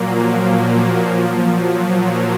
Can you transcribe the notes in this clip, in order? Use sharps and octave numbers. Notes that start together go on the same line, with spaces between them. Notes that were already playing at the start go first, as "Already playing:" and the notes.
Already playing: A#2 F3 F#3 A#3
F3
F#3
A#2 A#3